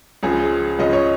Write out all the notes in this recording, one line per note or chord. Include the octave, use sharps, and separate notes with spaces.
C#2 C#3 F3 G#4
C#2 C#3 F3 C#4 D#5
C#5